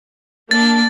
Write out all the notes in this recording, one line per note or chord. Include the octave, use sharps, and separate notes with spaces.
A#3 D4 A6